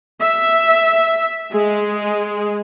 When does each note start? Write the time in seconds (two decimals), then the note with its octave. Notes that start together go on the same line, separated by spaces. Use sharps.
0.23 E5
1.51 G#3